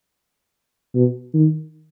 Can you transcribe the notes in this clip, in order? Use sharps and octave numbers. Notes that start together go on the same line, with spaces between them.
B2
D#3